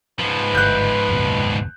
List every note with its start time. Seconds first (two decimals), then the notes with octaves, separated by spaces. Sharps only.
0.20 G#2 F3 B4
0.55 G1 F#6 G6
1.09 F#1 D#2 B2